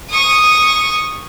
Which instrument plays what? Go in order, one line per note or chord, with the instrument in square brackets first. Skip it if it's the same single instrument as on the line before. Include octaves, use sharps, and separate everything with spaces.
[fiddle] C#6 D#6